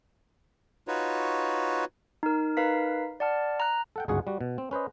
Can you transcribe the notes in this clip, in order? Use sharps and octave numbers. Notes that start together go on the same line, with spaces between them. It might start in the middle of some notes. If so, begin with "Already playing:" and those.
D#4 F4 F#4 B4 C#5
D#4 A#4
D#4 A#4 B4 F5 B6
D5 F#5 A5 F6
A#5 F#6
A4 F#5 G5
G1 C#2 G#2 F#4 G#4 F#5
G3 F#4
B2
C4
C#4 B4 C5 D#5